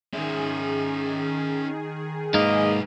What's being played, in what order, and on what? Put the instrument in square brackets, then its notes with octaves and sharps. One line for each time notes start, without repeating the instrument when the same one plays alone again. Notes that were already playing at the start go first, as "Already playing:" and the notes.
[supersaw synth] D#3 G#4 [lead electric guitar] C#4 E5
[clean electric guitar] G#2 A#3 [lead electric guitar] D#4 B4 [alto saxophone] D#5